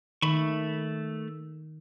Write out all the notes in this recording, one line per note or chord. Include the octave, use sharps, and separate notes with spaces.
D#3 A3 B5 C#6